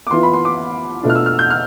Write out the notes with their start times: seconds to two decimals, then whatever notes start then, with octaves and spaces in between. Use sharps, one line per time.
0.07 D6
0.11 E3 B3 F4 C6
0.23 B5
0.33 C6
0.45 D6
1.03 B2 A3 D4 F4
1.10 F6
1.15 E6
1.26 F6
1.39 G6
1.50 F6